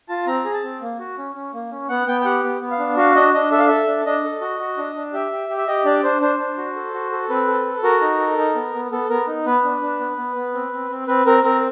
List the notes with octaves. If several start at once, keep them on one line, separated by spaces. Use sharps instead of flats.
F4 A5
C4 A#5
G#4
A5
C4
A#3
F#4
C#4
C#4
A#3
C#4
B3 F#5
B3 G5
G5
G4 F#5
B3
B3
F5
D4
F#4 F5
D4 D#5
D4 D#5
A4 E5
F5
A4 E5
D4
D4 D#5
A4
F#4
F#4
D4
D4
G4 E5
G4
G4
E5
G4 D#5
D4 D5
D4 C5
D4 C5
D4
F#4
A4
F#4
A4
C4 B4
A4
A4
F#4 A#4
D#4
A4
D#4
B3
B3
B3 A4
B3 A#4
D#4
B3 B4
D4
D4
B3
B3
B3
C4
C4
C4
C4 B4
C4 A#4
C4 A#4